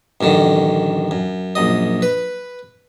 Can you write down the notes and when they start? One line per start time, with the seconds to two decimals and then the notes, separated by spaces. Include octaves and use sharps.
0.21 A1 F#2 D3 D#3
1.11 F#2
1.55 A#1 F#2 D#5
2.02 B4